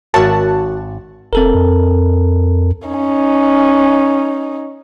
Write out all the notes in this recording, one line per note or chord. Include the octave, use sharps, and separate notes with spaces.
G#1 F#4 A#4 C#5 E5 A5
F1 C4 A4 A#4
F2
C#4 D#4